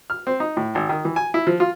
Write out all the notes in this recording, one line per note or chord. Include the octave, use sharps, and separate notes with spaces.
F6
C4
D#4
A2
G#1
D#3
E3
G#5
E4
F3
F4